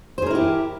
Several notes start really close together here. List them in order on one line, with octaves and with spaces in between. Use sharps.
C5 G#4 A#4 E4 G4